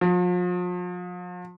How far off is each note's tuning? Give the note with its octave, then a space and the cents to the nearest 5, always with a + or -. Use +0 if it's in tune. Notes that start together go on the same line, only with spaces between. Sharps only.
F3 +40